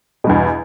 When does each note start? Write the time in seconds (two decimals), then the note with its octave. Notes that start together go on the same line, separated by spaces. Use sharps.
0.24 B2
0.27 G2
0.29 E2